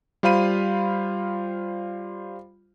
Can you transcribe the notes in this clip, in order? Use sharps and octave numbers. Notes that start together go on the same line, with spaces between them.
G3 F4 C5 F5 B5 D#7